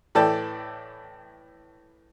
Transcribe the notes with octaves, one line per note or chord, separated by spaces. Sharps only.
A2 E3 A4 D5 G5 A5